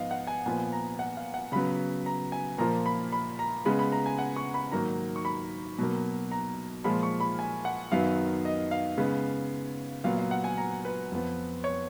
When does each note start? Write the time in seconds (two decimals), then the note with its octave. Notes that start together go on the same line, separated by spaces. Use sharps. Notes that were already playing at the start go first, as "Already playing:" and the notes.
Already playing: G#2 F3 B3 D#5 F5
0.11 F#5
0.27 G#5
0.46 A#2 F3 B3 G#5
0.73 A#5
0.99 F#5
1.17 F5
1.34 F#5
1.52 C#3 F#3 B3 B5
2.06 A#5
2.32 G#5
2.58 A#2 F3 A#3 A#5
2.86 B5
3.12 B5
3.39 A#5
3.65 C#3 G#3 B3 B5
3.79 B5
3.92 A#5
4.06 G#5
4.19 F#5
4.36 C#6
4.54 B5
4.72 G#2 D#3 F#3 A#3 A#5
5.16 C#6
5.25 B5
5.79 B2 F#3 A#3
6.31 A#5
6.84 A#2 F3 G#3 B5
7.03 C#6
7.20 B5
7.39 G#5
7.65 F#5
7.92 F#2 D#3 F#3 B3 F5
8.45 D#5
8.71 F5
8.98 C#3 G#3 B3
10.04 A#2 F#3 B3 F5
10.17 F5
10.31 F#5
10.44 G#5
10.58 A#5
10.85 B4
11.12 F2 F3 B3
11.64 C#5